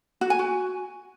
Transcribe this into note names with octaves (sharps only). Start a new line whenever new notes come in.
F#4
G#5
F#4